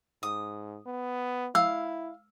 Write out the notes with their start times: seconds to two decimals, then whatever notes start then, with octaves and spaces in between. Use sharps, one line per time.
0.23 G#2 D#6
0.86 B3
1.55 E4 F5 E6